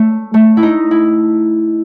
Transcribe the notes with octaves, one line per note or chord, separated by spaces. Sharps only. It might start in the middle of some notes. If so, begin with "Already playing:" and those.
Already playing: A3
A3
E4
D#4
E4